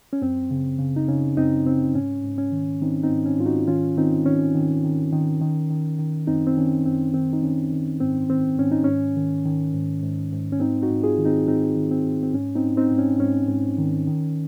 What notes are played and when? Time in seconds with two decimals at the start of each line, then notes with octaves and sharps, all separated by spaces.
0.13 C#4
0.22 F#2 C4
0.51 C#3
0.79 C#3
0.96 D#4
1.08 C#3 C#4
1.37 F#2 C4 D#4
1.66 C#3 C4
1.95 G#2 C#4
2.24 G#2
2.38 C#4
2.52 D#3
2.81 D#3 C4 D#4
3.03 C4 D#4
3.10 G#2
3.25 C#4
3.39 G#2 F4
3.46 D#4 F#4
3.68 D#3 C#4 F4
3.97 D#3 C4 D#4
4.26 D#3 C#4
4.55 D#3
4.84 D#3
5.13 D#3
5.41 D#3
5.71 D#3
5.99 D#3
6.27 F#2 C4 D#4
6.47 C4
6.57 D#3 C#4
6.86 F#2 C4
7.14 D#3 C4
7.33 D#4
7.43 D#3 C#4
7.72 D#3
8.00 G#2 C4
8.30 D#3 C4
8.59 G#2 C#4
8.72 D#4
8.84 G#2 C#4
9.16 D#3
9.46 D#3
9.74 G#2
10.02 G#2
10.32 G#2
10.52 C#4
10.60 G#2 C4 D#4
10.82 D#4 F#4
10.90 G#2
11.03 F4 G#4
11.18 D#3
11.25 C4 D#4
11.47 G#2 C4 D#4
11.76 D#3
11.91 C4
12.05 G#2
12.23 C4
12.34 G#2 C#4
12.55 C4 D#4
12.63 G#2
12.77 C4 D#4
12.92 G#2
12.98 C#4
13.20 G#2 C#4
13.49 G#2
13.79 D#3
14.07 D#3